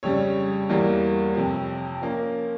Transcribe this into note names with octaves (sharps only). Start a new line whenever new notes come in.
F2 C#3 G3 C#5
E2 E3 G3 A#3
F2 C3 F3
F3 A#3 C#4